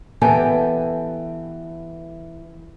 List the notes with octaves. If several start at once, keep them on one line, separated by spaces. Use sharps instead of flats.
E3 B3 G4 A4 G5 G#5